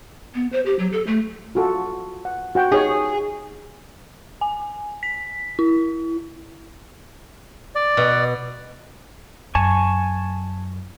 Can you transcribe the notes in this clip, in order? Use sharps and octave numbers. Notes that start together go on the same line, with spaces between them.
B3
C5
G4
F#3
A4
A3
F4 F#4 A4
F#5
F#4 F#5 G5
D#4 G#4 C#5
G#5
B6
E4
D5
B2
F#2 G#5 A5 C#6